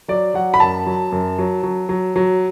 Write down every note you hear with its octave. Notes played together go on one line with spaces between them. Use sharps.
F#3 D5
F#3 F#5
B5
F#2 A5
F#3
F#2
F#3
F#3
F#3
F#3